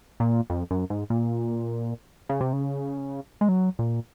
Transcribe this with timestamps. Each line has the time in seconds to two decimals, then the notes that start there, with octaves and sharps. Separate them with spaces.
0.20 A#2
0.50 F2
0.71 F#2
0.90 G#2
1.10 A#2
2.29 C#3
2.41 C3
2.53 C#3
3.41 G#3
3.49 F#3
3.79 A#2